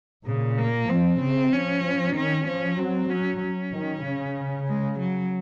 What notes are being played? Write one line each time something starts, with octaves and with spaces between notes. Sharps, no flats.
A#2 C#3
A#3
F3 C4
C#3 C4
F3 C#4
F3
D#3 C#4
F3 C#4
F#3 C4
F#3 C#4
C#4
D#3
C#3
G#3
F#3